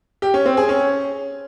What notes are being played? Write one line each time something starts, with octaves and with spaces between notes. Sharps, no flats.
G4
C#4
C4
G#4
C#4